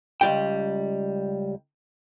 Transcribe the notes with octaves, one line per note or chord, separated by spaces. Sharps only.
C#2 G3 G5